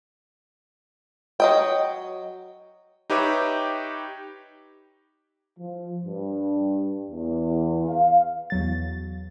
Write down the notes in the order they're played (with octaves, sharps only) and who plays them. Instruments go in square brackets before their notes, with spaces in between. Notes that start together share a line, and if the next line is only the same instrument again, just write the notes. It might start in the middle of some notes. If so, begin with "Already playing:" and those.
[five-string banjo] F#3 D#5 G5
[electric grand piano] D#4 G4 B4 C#5 E5 D6
[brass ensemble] F3
G2
E2
F5
[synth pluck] E2 F#3 A6